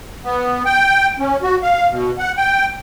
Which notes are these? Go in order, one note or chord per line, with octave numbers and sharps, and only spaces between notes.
B3
G5
C#4
F#4
F5
B2
F#5
G5